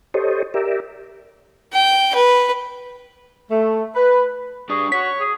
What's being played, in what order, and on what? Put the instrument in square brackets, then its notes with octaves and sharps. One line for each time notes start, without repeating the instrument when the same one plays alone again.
[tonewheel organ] G4 A4 C5 C#5 D#5
G4 A#4 D5 E5
[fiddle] G5
B4
[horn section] A3
B4
[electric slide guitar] D4 G4 D5 [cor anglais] G#4 [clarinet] C#6
[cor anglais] F#4 [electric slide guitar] C#5 [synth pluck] B6
[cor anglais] G#4